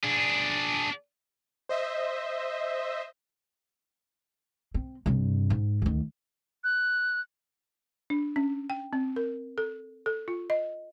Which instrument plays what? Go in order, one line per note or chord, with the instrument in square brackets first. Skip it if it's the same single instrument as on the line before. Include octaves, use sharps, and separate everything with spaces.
[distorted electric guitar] D4 G#4
[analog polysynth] C5 D#5 E5
[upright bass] C4
G2 C3
G#2
D2 D#3
[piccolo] F#6
[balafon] D4
C#4
G5
C4
A#4
A4
A4
F4
D#5